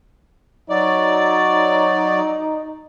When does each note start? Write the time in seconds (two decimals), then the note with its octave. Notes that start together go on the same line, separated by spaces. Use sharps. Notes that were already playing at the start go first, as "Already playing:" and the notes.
0.70 F#3 D#4 D5